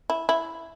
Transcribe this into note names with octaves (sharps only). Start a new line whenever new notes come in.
E4
E4